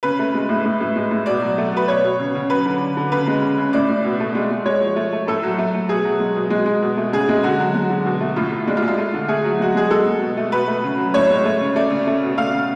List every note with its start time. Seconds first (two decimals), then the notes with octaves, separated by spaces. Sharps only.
0.03 C#3 B4
0.19 A3
0.34 G#3
0.49 A2
0.65 A2
0.80 A2
0.96 G#3
1.11 A2
1.26 B2 D5
1.42 F#3
1.58 A3
1.73 B2 B4
1.88 B2 C#5
2.04 B2
2.19 C#3
2.35 C#3
2.50 F#3 B4
2.65 D3
2.81 D3
2.97 D3
3.12 C#3 B4
3.27 G#3
3.42 C#3
3.58 C#3
3.73 A2 D5
3.88 A2
4.04 B2
4.20 A3
4.35 G#3
4.51 G#3
4.66 G#3 C#5
4.81 F3
4.96 A3
5.13 A3
5.27 A2 A4
5.43 F#3
5.58 A3
5.74 A3
5.89 B2 G#4
6.05 F#3
6.20 G#3
6.36 B2
6.50 G#3
6.66 G#3
6.82 B2
6.97 A3
7.12 C#3 G#4
7.29 G#3
7.43 D3 F#4
7.59 F#3
7.75 G#3
7.90 D3
8.06 B2
8.21 A3
8.36 A2 F4
8.52 A2
8.67 G#3 D4
8.77 F4
8.82 G#3
8.88 F4
8.98 A3
9.14 D3
9.28 A3 G#4
9.44 F#3
9.60 G#3 F#4
9.75 G#3 G#4
9.91 G#3 A4
10.06 G#3
10.22 B2
10.37 A3
10.52 B2 B4
10.67 A3
10.84 C#3
10.98 F#3
11.14 A2 C#5
11.30 G#3
11.45 A3
11.61 C#3
11.76 A3 D5
11.90 C#3
12.07 A3
12.22 B2
12.37 A3 F5
12.52 C#3